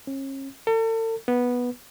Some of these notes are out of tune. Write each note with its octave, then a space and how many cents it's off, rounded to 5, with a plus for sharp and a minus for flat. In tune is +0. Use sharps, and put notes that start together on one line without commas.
C#4 -35
A4 +40
B3 -10